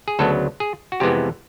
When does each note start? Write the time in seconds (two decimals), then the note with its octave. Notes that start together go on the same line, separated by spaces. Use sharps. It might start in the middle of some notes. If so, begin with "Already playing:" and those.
0.08 G#4
0.19 D2 C#3 F#3 B3 A4
0.60 G#4
0.92 F#4
1.00 F2 C3 E3 G#3 B3 G4